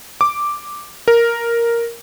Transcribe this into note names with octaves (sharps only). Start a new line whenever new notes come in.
D6
A#4